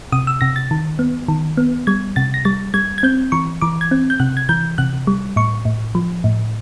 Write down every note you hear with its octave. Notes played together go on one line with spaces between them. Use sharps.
C3 D#6
E6
C3 A#6
A6
D#3
B3
D#3
B3
G3 G#6
C3 A6
A#6
G3 A6
G3 G#6
G#6
C4 G6
E3 C#6
E3 D6
G#6
C4
G6
C3 F#6
G#6
E3 G6
C3 F#6
G3
A2 C#6
A2
F3
A2